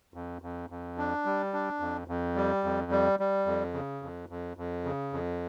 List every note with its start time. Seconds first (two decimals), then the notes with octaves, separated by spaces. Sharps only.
0.14 F2
0.42 F2
0.70 F2
0.98 D4
1.25 G3
1.53 D4
1.80 F2
2.08 F2
2.36 G3
2.64 F2
2.91 G3
3.20 G3
3.46 F2
3.74 C#3
4.02 F2
4.29 F2
4.57 F2
4.85 C#3
5.13 F2